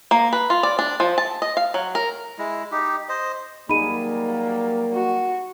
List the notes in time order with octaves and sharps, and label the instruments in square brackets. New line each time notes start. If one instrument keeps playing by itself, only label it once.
[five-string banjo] A#3
B4
F4
D5
D4
F3
A5
D#5
F5
F#3
A#4
[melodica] G#3 E4
D#4 G4
C5 D#5
[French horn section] F#3 G3 A#3 [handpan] D#4 G#4 [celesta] B5 D#7
[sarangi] F#4